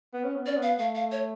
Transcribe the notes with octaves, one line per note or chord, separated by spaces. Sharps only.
B3
C#4
B3
C#4 D5
B3
F5
A3 F5
F5
C#5